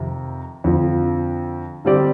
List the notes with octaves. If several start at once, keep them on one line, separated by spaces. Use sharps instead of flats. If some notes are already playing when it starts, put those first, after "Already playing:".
Already playing: F2 C3 D#3
F2 D3 F3
D3 G3 C4 G4 D5